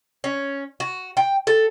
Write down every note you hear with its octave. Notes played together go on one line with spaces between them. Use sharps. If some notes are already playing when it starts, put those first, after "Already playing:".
C#4
F#4
G5
A4